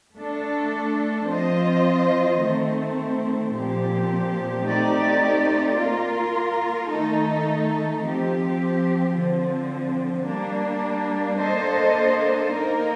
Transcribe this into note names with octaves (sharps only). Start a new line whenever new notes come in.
A3 D4 A4
F3 C4 F4 C5 D#5
D#3 A3 C4
A#2 F3 C4 G4
A3 C4 D#4 G4 D5
A#3 F4 A#4
D#3 A3 D#4 A4
F3 C4 G4
D3 F3 C4
G3 A#3 D4
A#3 D4 A4 C5 D#5
A#3 D#4 A#4